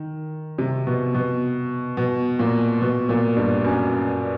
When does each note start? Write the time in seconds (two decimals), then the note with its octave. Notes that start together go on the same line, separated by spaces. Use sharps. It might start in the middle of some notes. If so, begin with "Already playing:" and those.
Already playing: D#3
0.58 C3
0.87 B2
1.14 B2
1.97 B2
2.39 A#2
2.81 B2
3.09 A#2
3.36 G2
3.64 F#2